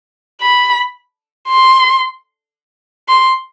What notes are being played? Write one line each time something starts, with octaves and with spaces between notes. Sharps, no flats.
B5
C6
C6